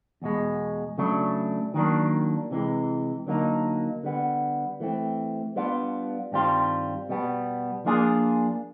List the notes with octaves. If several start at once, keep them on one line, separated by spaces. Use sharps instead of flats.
E2 B2 G#3
C#3 F#3 A3 D4
D#3 F#3 A#3 D4
C3 E3 G#3
D3 F#3 A#3 D#4
D3 G3 B3
E3 A3 C4
G3 B3 D4 F4
G2 D#3 G3 C4 F4
B2 G3 B3
F3 A#3 D4 F4 G#4